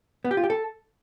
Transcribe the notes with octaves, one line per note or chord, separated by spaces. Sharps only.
B3
G4
F4
G4
A4